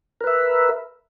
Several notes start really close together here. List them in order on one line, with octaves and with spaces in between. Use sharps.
A#4 B4 E5